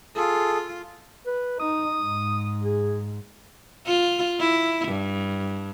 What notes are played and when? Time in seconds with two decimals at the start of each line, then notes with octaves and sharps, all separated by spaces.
0.16 F4 G#4 A4
1.27 B4
1.59 D#4 D#6
2.02 G#2
2.64 G#4
3.87 F4
4.39 E4
4.88 G2